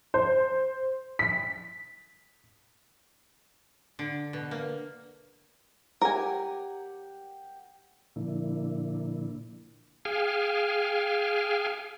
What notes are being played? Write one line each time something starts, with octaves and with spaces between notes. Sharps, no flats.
C5
B6
D3
B2
A#3
G4 A#4 F#5 G#5 D6
A#2 D3 F3 A#3 D4 E4
G#4 F5 G5 G#5 F6